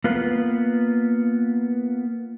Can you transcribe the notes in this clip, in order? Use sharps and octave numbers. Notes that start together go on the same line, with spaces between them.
A#3 B3 F4 B4